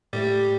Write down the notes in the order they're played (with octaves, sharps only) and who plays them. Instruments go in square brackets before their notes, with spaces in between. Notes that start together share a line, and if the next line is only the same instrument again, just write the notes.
[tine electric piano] A2 A3 G4 [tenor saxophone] G3